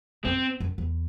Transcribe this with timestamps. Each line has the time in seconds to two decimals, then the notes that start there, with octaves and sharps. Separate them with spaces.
0.25 F#2 C4
0.60 F#2
0.78 E2